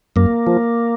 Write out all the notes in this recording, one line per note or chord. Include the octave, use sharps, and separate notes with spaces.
F#2 A#3
F3